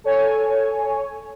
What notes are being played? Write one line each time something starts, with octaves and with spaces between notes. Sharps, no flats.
A4 C#5 G#5